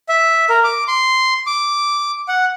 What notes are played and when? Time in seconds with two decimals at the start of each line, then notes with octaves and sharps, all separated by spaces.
0.09 E5
0.50 A#4
0.64 D6
0.88 C6
1.47 D6
2.28 F#5